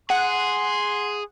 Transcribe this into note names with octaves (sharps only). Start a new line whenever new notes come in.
G#4 F#5 C6